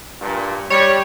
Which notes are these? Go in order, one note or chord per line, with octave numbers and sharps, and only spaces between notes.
G2 A#2
G3 C#5